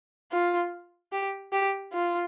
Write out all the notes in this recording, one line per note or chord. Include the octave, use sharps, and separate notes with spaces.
F4
G4
G4
F4